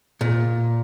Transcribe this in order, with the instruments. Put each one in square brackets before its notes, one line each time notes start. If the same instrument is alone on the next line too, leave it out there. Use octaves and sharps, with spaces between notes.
[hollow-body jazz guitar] A#2